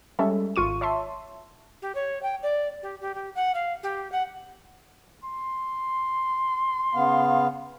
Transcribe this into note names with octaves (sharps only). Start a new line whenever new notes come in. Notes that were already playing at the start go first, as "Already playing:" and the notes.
G3 G#3 C#4 A4 E5
G#1 F4 C#6 D#7
C#5 E5 A5 C6
G4
C#5
G5
D5
G4
G4
G4
F#5
F5
G4
F#5
C6
C#3 B3 F5